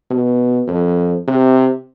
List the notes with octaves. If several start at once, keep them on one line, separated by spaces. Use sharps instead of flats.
B2
F2
C3